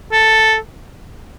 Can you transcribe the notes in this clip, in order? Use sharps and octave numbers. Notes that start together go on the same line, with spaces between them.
A4